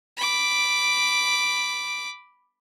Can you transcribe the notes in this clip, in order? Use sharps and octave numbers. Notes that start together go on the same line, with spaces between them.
B5 D6